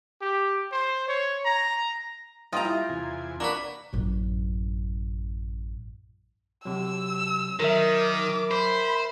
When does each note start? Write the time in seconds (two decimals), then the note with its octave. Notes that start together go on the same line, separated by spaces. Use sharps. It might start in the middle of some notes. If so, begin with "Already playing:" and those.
0.21 G4
0.72 C5
1.08 C#5
1.45 A#5
2.52 G3 F4 D#5 G5 A#5 B5
2.65 E4
2.89 E2 C3 G#5
3.40 A#3 D4 F#4 B4
3.93 A1 F#2
6.65 C3 F#3 E6
7.60 D#3 F#3 A#4 E5
7.94 D6
8.51 C5 B5